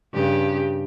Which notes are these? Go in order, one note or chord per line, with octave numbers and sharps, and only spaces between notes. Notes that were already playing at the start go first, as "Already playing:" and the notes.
G2 C#3 G4